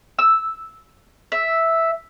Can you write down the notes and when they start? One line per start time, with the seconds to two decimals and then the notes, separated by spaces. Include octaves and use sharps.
0.19 E6
1.32 E5